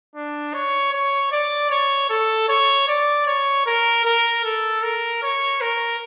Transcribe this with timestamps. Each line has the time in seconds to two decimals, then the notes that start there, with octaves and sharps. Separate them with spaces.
0.15 D4
0.54 C#5
0.92 C#5
1.31 D5
1.71 C#5
2.10 A4
2.49 C#5
2.88 D5
3.27 C#5
3.67 A#4
4.05 A#4
4.44 A4
4.83 A#4
5.23 C#5
5.61 A#4